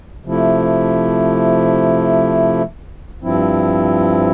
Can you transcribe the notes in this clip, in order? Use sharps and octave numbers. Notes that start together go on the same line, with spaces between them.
C3 F3 A3 E4
G2 F3 C4 E4